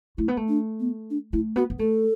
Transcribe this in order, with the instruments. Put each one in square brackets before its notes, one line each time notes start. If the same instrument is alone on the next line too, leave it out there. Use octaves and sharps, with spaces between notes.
[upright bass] A3 [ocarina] E4
[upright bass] B3
A3
[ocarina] D4
B3
D4
[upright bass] A3 [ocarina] E4
[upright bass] B3 [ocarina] F#4
[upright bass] B3
[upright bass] A3 [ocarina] A4